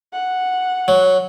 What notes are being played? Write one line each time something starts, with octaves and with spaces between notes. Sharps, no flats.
F#5
F#3